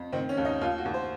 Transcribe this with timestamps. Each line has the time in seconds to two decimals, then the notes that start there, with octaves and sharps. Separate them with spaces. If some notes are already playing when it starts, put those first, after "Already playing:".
Already playing: F2
0.12 D#3 C4
0.29 C#4
0.37 D#2
0.45 D#4
0.61 D#2 F4
0.78 F#4
0.85 D#2
0.94 C5